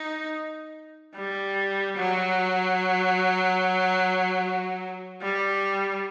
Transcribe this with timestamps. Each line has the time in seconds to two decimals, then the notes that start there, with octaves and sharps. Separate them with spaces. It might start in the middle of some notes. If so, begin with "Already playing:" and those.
Already playing: D#4
1.16 G3
1.97 F#3
5.22 G3